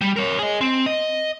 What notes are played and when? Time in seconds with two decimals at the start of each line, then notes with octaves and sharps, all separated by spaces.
0.01 G3
0.16 A#4 C#5
0.39 G#4 D#5
0.61 C4
0.86 D#5